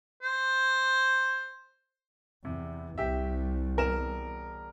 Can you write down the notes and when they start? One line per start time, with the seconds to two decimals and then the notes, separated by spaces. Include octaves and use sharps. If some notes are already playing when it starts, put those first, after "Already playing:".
0.22 C5
2.45 E2 C3
2.98 C2 G4 E5
3.77 E1 A#4 E7